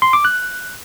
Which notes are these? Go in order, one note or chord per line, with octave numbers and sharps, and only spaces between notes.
C6
D6
F#6